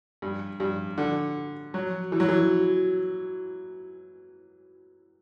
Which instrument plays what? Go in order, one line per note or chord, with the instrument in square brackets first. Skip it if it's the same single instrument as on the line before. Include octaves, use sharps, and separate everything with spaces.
[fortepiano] G2
G2
D3
F#3
E3
F#3
E3